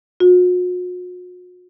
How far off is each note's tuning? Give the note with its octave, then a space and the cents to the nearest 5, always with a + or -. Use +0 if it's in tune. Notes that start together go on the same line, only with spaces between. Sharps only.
F#4 -45